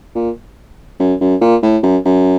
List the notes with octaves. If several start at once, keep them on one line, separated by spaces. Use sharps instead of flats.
A#2
F#2
F#2
A#2
A2
F#2
F#2